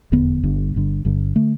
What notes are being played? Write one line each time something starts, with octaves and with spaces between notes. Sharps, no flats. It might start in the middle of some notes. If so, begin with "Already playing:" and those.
F1 E2 D3 B3
G1 G2 D3
G1 G2 D3
G1 G2 D3
D3 A3